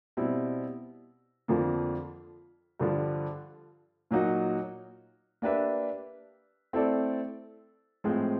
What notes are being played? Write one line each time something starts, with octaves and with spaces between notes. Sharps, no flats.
B2 G3 C4 E4
F2 D3 F3 A#3
G2 D3 F3
A#2 F#3 A#3 D#4 F#4
A#3 D4 G4 B4 E5
A3 C4 E4 A4 D5
A2 F3 G#3 C4